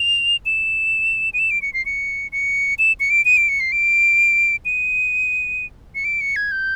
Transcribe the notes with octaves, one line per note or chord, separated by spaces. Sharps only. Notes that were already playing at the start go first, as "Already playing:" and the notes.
Already playing: F7
E7
D#7
E7
D7
C#7
C7
C#7
C#7
E7
C#7
D7
D#7
D7
C#7
C7
D7
D#7
C#7
D7
C#7
G#6
G6